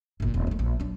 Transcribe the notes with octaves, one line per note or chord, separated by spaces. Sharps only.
G1 A#2
D#1
E3 A3
A#1 F3
F#3 D4